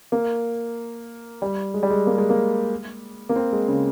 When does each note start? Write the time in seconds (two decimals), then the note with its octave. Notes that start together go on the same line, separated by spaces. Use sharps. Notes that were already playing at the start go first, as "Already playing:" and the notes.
0.12 A#3
1.42 G3
1.74 G#3
1.83 G3
1.90 G#3
2.07 A#3
2.18 G#3
2.30 A#3
3.29 A#3
3.36 C4
3.53 G#3
3.68 C#3